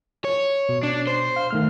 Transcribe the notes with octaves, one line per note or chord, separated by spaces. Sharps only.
C#5
B2
D4
C5
F5
D#3 A3 F6